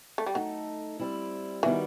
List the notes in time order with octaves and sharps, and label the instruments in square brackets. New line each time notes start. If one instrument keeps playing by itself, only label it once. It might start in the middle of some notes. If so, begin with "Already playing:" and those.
[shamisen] A3
G3
[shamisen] F#3 [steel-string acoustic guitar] A3 D#4 A4
[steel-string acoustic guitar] G3 C4 E4
[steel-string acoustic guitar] D#3 G3 B3 F#4 [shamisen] E3